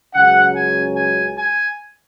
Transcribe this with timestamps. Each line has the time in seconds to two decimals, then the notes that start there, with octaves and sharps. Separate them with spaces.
0.14 C#2 C#3 F#3 C#4 F#5
0.55 G#5
0.96 G#5
1.37 G#5